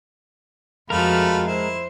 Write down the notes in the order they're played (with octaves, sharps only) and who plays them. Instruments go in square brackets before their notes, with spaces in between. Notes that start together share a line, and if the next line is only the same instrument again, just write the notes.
[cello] F2 F#4 [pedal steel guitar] G#3 A#4 [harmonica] A3 F4 B5
[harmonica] E4 [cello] C5